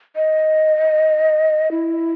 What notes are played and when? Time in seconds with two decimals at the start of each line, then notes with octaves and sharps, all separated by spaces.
0.16 D#5
1.71 E4